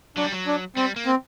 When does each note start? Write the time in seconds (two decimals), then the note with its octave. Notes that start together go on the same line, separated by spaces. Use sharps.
0.17 F#3 D4
0.24 G3
0.32 F#3
0.47 D4
0.76 G3 C4
0.96 A#3
1.06 C4